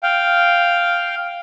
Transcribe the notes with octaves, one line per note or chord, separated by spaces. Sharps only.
F5 G5